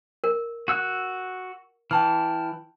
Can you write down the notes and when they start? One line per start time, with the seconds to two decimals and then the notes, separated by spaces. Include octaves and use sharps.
0.24 A#4
0.68 F#4 E6 F#6
1.91 E3 G5 A5 F6